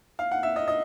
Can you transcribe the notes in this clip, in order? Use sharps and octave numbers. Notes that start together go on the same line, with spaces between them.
F5
F#5
E5
D#5
D#5